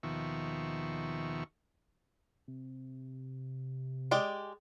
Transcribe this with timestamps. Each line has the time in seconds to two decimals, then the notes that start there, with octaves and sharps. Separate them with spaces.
0.03 D#2 B2 D#3 F3 E5 C#6
2.48 C3
4.11 G#3 G4 D5